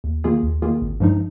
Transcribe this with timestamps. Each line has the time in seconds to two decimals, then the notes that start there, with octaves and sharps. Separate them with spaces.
0.04 D#2
0.24 D#3 A#3 F4 G#4
0.43 D#2
0.62 D#3 A#3 F4 G#4
0.82 G#1
1.00 G2 F3 G#3 D#4